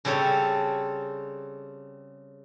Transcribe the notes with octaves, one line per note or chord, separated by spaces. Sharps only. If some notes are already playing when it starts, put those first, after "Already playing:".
C#3 G3 C4 A4 C#5